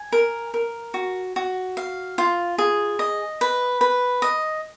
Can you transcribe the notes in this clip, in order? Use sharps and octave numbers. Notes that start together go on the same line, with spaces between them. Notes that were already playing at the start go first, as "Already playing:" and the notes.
Already playing: G#5
A#4
A#4
F#4
F#4
F5
F4
G#4
D#5
B4
B4
D#5